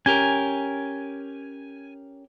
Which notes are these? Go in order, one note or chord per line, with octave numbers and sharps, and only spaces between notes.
C#4 G4 A#4 G#5